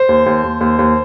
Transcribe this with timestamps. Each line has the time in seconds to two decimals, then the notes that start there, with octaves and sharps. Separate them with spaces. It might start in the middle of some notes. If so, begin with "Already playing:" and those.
Already playing: C5
0.09 D#2
0.26 D#2
0.44 D#2
0.61 D#2
0.79 D#2